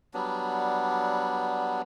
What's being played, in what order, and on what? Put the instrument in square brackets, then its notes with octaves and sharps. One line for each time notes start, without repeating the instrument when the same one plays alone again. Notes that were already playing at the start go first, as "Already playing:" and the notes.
[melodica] F#3 G3 B3 D4